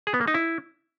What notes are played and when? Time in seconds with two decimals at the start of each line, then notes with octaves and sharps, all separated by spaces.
0.07 G#4
0.14 B3
0.21 A#3
0.28 D#4
0.34 E4